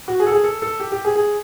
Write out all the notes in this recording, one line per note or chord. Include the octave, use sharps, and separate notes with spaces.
F#4
G#4
A4
G#4
A4
A4
G4
G4
G#4
G#4